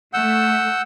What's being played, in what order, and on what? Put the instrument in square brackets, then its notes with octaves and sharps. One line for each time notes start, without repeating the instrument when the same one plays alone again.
[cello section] A3 [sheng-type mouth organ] F#5 E6 G6